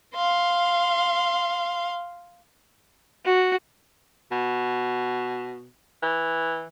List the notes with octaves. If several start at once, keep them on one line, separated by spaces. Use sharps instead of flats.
F5 C6
F#4
B2
E3